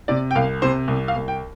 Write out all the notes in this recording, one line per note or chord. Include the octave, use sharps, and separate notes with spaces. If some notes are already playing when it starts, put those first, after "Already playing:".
C3 D5
G5
C2 F5
C3 C5
C2
F5
C2
G5